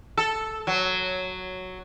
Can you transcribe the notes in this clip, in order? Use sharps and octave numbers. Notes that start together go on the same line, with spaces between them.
A4
F#3